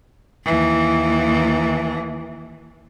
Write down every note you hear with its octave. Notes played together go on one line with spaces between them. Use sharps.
D#2 E3